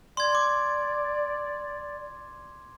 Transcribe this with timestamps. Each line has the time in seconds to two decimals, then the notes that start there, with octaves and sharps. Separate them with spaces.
0.17 D5 C6 G#6
0.35 D6